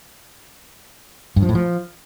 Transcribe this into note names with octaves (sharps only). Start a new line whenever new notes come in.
G2
F3
A2
F3